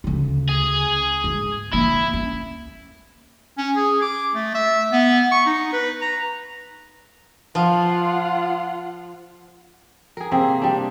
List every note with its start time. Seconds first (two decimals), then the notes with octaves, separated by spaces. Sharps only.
0.04 D2 C#3
0.49 G#4
1.24 G#2
1.73 E3 A#3 E4
2.13 C#4
3.58 C#4
3.76 G#4
4.02 D6
4.35 A3
4.54 E5
4.92 B3
5.31 C#6
5.46 D#4
5.73 B4
6.01 A#5
7.55 F3 F4 F#5
10.17 G#4 A#4
10.31 C3 A#3 G4 G#4
10.62 G3 D4